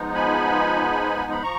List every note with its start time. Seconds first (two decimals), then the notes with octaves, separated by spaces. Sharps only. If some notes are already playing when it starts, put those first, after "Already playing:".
Already playing: F3 G#3 B3 D#4
0.14 G#5 B5
1.31 B5
1.43 F3 A#5 C#6